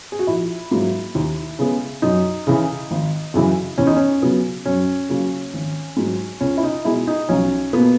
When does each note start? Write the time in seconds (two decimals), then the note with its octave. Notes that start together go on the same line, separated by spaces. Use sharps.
0.12 G#4
0.19 F#4
0.27 A#1 E4
0.71 G#2 F#3 A#3
1.15 D#2
1.59 C#3 G#3 B3
2.02 F#2 D#4
2.47 C#3 E3
2.91 G#1
3.34 F#2 C#3 E3
3.78 E2 C#4
3.87 D#4
3.96 C#4
4.22 C#3 F#3 B3
4.66 F#2 C#4
5.09 C#3 F#3 A#3
5.53 G#1
5.97 G#2 F#3
6.41 C#2 C#4
6.57 E4
6.64 D#4
6.85 B2 G#3 E4
7.07 D#4
7.29 B1 C#4
7.73 B2 A#3 B3